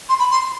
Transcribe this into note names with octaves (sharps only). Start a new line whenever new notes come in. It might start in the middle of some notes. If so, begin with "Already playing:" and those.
C6
B5
C6